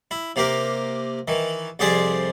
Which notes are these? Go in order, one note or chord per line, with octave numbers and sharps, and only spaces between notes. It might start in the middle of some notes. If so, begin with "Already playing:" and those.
E4
C3 A#3 G4 A#4
D#3 E3
C2 F2 G4 G#4 C5 D5